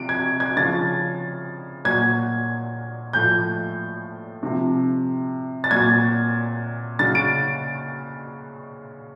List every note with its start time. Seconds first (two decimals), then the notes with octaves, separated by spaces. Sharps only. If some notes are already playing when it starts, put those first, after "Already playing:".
Already playing: C3 F3 D7
0.09 G#6
0.40 G#6
0.56 C#3 F3 A6
1.85 A#2 F#3 G#6
3.13 A2 F3 G6
4.43 C3 F3
5.64 A6
5.71 A#2 F#3 G#6
6.99 C#3 F#3 A6
7.15 D7